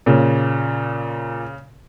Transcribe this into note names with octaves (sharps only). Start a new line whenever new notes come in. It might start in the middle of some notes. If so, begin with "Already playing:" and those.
A#2 C#3